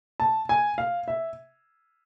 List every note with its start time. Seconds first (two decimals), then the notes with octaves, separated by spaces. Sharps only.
0.20 A5
0.49 G#5
0.78 F5
1.08 E5